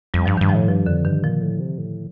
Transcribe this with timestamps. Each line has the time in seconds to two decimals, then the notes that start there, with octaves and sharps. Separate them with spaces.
0.14 F2 G3
0.26 G2 F3
0.37 G2 D#3
0.49 F3
0.55 A2
0.68 G2 F3
0.86 F2 D3
1.05 G2 D#3
1.23 A#2 F3
1.41 A2
1.60 C3
1.78 A2